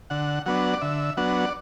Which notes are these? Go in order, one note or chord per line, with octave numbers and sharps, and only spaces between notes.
D3 F#5
F#3 B3 D4 F#5
D5
D3 E5
F#3 B3 D4 F#5
D5